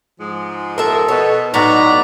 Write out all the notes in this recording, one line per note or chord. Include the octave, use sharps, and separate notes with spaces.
G#2 F3 G#3
A4 A#4 E5
B2 C#5
A2 F#3 B3 D#4 F#4 D5 E5 A#5